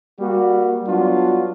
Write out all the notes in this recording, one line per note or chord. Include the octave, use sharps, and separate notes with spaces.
G3 A#3 F#4
F#3 G3 B3 D4 F4 F#4